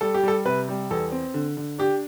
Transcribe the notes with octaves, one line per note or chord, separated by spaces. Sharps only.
G3 A4
G4
G3 A4
C3 B4
G3
E2 A4
C4
D3
D3
D4 G4